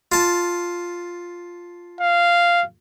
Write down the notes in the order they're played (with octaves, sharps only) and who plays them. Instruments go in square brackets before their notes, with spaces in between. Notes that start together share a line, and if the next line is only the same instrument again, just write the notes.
[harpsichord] F4 A5
[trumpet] F5